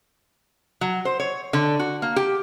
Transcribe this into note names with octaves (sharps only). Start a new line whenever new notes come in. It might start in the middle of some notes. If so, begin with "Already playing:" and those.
F#3
C5
C#5
D3
F#4
A#3
G4